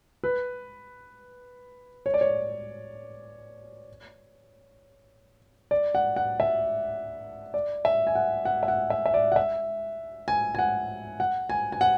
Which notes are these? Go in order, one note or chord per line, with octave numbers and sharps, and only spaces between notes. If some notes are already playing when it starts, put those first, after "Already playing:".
B4
C#5
D5
C#5
D5
F#5
F#5
E5
D5
E5
G#5
F#5
F#5
E5
F#5
E5
E5
D5
F#5
E5
G#5
G#5
F#5
F#5
G#5
G#5
F#5